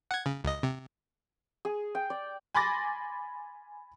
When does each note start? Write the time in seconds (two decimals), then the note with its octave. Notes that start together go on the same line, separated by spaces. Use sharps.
0.11 F#5 G#6
0.26 C#3
0.44 C#2 D#5
0.63 C3
1.65 G#4
1.95 G5
2.10 D5
2.54 G#5 B5 C6 D6 A6 A#6